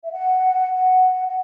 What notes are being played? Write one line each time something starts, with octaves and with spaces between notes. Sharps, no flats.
E5
F#5
F#5
F#5